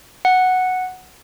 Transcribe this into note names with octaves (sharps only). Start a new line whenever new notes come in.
F#5